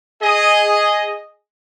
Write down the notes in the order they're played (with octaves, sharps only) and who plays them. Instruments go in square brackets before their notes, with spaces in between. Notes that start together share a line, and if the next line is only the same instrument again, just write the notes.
[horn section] G#4 D#5